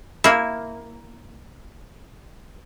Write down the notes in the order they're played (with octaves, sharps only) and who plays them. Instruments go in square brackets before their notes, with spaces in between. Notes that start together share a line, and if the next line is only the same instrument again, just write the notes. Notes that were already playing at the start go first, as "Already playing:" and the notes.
[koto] A#3 E4